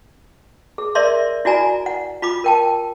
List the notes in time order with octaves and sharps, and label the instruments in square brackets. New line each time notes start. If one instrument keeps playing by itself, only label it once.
[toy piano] G#4
A#4 C#5 D5 E5 C6
E4 F#4 D5 G#5 A#5
F#5
F4 B5 D6
A#4 G5 A5